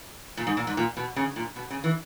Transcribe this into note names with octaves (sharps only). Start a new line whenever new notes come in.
A#2
G#2
A#2
G#2
A#2
B2
C#3
A#2
B2
C#3
E3